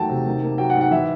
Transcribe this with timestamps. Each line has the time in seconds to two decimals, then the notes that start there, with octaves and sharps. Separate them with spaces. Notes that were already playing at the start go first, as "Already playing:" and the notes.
Already playing: E2 D#3 F#3 A3 G5 A5
0.09 C3
0.27 D#3
0.43 A#3
0.58 F#3 G5
0.70 F#5
0.75 G#2
0.81 F#5
0.91 E3 E5